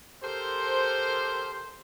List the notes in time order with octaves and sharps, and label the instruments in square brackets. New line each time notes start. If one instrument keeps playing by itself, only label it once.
[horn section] G4 A4 A#4 C5